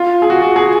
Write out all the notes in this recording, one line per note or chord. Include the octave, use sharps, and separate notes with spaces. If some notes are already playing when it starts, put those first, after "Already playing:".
Already playing: F4
G#4
F#4
F#4
G#4